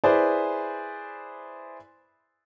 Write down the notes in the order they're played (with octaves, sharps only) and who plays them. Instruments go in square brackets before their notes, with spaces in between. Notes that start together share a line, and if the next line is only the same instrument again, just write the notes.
[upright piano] E4 G#4 B4 C5 D5